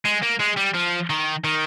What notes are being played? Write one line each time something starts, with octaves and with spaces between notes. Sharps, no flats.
G#3
A#3
G#3
G3
F3
D#3
D#3